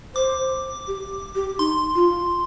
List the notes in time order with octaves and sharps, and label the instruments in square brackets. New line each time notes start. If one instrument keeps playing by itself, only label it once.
[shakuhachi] C5 [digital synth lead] D6
[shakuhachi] G4
G4
[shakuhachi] D#4 [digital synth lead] C6
[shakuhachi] F4